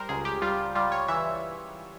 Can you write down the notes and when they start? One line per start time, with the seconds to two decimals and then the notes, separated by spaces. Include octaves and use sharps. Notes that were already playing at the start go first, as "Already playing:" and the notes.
Already playing: G3 A#4 C5
0.09 C#2 G#4
0.25 G4
0.42 G3 F4
0.75 G3 F4
0.92 C#5
1.08 E3 E5